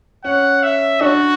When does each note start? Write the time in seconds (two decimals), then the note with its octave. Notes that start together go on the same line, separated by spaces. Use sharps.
0.24 C#4 F#5
0.63 E5
1.01 D4 F#4